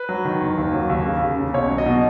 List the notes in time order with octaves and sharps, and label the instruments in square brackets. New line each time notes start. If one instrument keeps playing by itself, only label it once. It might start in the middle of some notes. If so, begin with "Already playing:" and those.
Already playing: [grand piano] B4
F#3
D#3
F#1
D#2
F#3
D#2
C#3
D#2
C#3
B1 C#5
F#3
D#5
B2